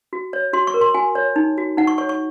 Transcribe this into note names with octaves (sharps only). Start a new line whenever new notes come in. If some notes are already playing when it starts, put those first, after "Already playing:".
F#4
C#5
F#4 C6
C#6
A#4
C6
F#4 G#5
C#5
D#4
F#4
D#4 F#5
C#6
C#5 C#6
C#6